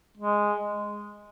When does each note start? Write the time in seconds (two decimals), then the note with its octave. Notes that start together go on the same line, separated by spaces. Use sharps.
0.17 G#3